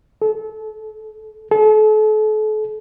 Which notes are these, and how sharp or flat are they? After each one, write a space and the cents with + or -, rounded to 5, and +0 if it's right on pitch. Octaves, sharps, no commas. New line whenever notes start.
A4 -30
A4 -40